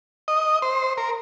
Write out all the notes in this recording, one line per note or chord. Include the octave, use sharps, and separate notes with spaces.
D#5
C5
A#4